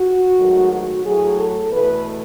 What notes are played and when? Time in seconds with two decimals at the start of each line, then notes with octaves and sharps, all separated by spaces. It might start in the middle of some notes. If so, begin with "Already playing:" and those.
Already playing: F#4
0.38 G#2 D#3 F#3 A3
0.71 F#4
1.04 A2 F#3 A3 G#4
1.38 A4
1.71 E2 B2 A3 B4